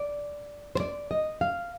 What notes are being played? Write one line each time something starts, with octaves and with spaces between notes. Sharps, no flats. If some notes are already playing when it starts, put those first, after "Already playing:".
Already playing: D5
C5
D5
D#5
F5